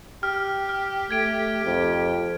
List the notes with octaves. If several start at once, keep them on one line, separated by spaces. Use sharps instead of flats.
G4 F6
F6
A3 G#6 D7
F2